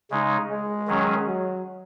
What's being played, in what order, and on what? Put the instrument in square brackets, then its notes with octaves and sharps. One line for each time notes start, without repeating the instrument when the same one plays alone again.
[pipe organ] C#3 G#3 D#4
[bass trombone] G#3
[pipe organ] D#3 F#3 C#4 G#4
[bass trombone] F#3